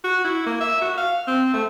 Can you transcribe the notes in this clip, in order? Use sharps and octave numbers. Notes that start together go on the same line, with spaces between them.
F#4
E4
A#3
E5
F#4
F5
C4
A3